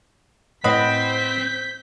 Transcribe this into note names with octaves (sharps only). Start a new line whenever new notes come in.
A2 C4 B4 D#5 F#5 B5 G6 B6